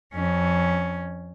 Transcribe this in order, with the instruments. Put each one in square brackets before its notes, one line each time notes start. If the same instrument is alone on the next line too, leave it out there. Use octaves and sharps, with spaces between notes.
[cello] F2 C#4